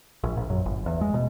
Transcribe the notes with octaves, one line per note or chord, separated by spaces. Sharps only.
A#1
A#1
F#2
G1
E2
G#3
B2